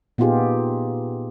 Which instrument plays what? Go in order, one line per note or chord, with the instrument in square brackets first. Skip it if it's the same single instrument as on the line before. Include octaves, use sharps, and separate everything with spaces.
[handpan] A#2 B3 D#4 F4 G4 G#4